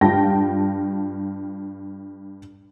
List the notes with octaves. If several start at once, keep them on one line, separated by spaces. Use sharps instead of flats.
G2 F4 G5 A5 A#6